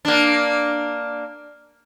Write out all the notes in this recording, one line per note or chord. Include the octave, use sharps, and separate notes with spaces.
A#3 D4